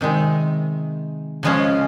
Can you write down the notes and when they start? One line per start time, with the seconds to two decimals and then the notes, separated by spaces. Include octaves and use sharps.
0.01 C3 D#3 G#3
1.43 C#3 F3 G#3 C#4